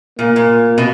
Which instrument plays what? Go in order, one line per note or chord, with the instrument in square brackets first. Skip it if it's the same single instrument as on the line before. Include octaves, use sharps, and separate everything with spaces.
[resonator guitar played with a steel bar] A#2 [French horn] A#3
[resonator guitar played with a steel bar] A#2
B2